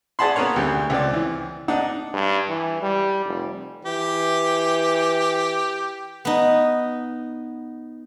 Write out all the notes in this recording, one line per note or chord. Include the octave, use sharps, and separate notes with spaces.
G#4 D5 F#5 A5 B5 C6
A#3 B3 C#4 A#4 C#5
D2 G3
C#2 C4 D5
E3
D4 D#4 F#5
G2
E3
G3
F1
E3 G4
B3 D#4